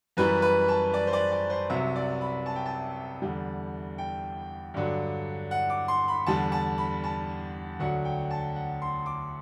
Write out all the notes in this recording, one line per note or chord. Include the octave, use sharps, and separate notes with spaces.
F#2 E3 G3 B4
B4
A5
D5
C5
D5
D5
C5
C2 C3 F#3 E5
D5
B5
A5
G5
A5
E2 D3 G3
G5
G2 D3 F#3
F#5
D6
C6
B5
E2 D3 G3 A5
A5
B5
A5
D2 D3 F#3 F#5
G5
A5
F#5
C6
D6